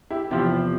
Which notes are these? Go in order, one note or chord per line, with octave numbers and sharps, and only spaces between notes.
E4 G4
E2 C3 F3 E4 G4